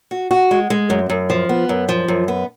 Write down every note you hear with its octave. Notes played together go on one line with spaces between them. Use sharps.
F#4
F#4
G#3
G#3
F#2
F#2
F3
B3
F#2
F3
F#2
B3